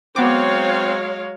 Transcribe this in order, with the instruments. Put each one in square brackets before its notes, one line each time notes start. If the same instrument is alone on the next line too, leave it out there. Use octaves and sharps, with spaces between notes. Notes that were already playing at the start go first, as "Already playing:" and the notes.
[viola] F#3 G#3 [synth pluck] B3 D6 [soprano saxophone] C4 [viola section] C#5 F5